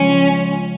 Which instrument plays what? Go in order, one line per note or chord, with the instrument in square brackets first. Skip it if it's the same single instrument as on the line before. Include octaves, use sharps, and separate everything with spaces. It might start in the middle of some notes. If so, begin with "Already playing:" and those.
Already playing: [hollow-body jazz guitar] C#2 F3 [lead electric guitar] C#4